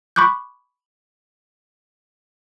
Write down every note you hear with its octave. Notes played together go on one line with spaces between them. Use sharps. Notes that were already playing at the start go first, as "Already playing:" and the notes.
B5 C#6 D6 F#6 G6